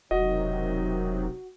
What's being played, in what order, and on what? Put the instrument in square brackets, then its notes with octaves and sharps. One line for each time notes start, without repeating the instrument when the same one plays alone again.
[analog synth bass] E1 [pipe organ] C3 D#3 F#3 [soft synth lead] F#4 [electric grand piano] D#5